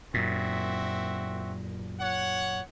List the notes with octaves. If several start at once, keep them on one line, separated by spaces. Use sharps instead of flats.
F#2 A#2 C4 F#4 E5
C#5 F#5